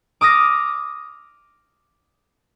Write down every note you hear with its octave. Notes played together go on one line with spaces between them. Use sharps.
D6 D#6 F6 A#6